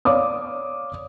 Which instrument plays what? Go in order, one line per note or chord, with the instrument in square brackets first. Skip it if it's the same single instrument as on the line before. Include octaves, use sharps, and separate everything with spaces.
[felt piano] C#5 D5 F5 D6 D#6